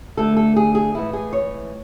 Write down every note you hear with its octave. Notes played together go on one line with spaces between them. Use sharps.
D2 D3 A3 A4
A4
G#4
G#4
A2 E3 G#3 B3 E4
G#4
C#5